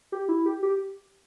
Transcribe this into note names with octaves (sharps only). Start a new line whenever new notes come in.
G4
E4
G4
G4